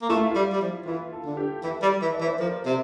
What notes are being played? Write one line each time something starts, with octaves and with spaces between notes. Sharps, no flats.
A#3
A3 F4
E4
G3 F4
G3
F3
E3 F4
A4
D3
G4
E3 A4
G3
E3
D5
E3
C5
F3 A#4
C3